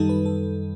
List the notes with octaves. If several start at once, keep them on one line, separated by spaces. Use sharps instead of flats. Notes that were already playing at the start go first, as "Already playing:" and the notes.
Already playing: F#2 D#3 G3 D#4 A4
B4
A4